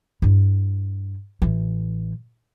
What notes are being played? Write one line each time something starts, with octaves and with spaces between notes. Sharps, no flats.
G2 E4
A1 E3